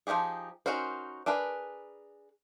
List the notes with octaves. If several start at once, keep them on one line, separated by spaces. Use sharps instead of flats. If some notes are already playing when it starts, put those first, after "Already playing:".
F3 F#3 D#4 G4 G#4
C#4 D#4 F#4 A#4 C5
D4 G#4 A#4 B4